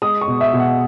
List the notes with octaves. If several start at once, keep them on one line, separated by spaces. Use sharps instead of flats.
G#3 D#6
C#6
B2
E5
B2
F#5